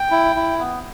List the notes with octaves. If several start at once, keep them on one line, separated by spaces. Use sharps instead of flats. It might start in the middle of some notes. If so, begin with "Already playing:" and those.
Already playing: G5
E4
E4
B3